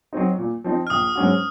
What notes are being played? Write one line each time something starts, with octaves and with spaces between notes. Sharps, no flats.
F#3 C4 D#4
A#2
F3 C4 D#4
F6
A#1 D#6
G#2 F#3 C#4 F#4